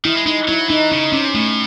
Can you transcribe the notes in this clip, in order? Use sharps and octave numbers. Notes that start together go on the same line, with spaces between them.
D#3 E4
G#3
G#3 D#4
F#3 E4
E3 D#4
C#3 D#4
C3 C#4
A2 A3